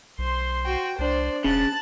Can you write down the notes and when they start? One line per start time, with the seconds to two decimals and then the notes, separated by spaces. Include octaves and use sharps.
0.18 B1 C5 C6
0.63 F#4 G5
0.99 C2 D4 C5 D5
1.44 E1 C#3 A5 F#6 A6